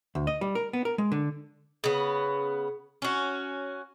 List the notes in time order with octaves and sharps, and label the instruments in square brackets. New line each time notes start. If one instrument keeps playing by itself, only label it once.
[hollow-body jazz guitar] D2
D#5
G3
A#4
B3
A#4
G#3
D3
[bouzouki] C#3 B3
C#4 F#4